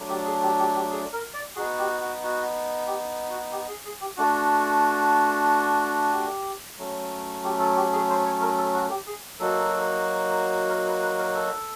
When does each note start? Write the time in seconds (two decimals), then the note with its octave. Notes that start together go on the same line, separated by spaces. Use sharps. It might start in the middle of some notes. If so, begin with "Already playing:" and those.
Already playing: F#3 A3 D4
0.09 G4
0.25 G#4
0.42 G4
0.59 G4
0.75 G4
0.90 G#4
1.13 A#4
1.34 D5
1.56 B3 D#4 F#4 G#4
1.78 G4
2.00 F#4
2.23 F#4
2.87 G4
3.30 F#4
3.51 G4
3.68 G#4
3.85 G#4
4.01 G4
4.17 A3 D4 F#4
6.12 G4
6.78 F#3 A3 C#4
7.44 G4
7.60 A4
7.77 G4
7.92 G#4
8.09 C5
8.26 C#5
8.41 A#4
8.58 A4
8.74 F#4
8.90 G4
9.06 G#4
9.39 F#3 A#3 D#4 F#4 A4
10.69 A#4
10.86 B4
11.02 B4
11.18 A#4
11.35 A4